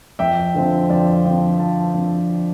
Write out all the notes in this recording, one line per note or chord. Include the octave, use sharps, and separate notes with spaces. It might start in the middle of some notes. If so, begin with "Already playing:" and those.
F2 E5 G5
D3 F3 C4
F2 D5 F5
D3 F3 C4
F2 F5 A5
D3 F3 C4